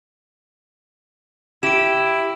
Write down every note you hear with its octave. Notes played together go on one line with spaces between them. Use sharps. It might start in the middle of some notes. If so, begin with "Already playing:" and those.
E4 G4 D7 E7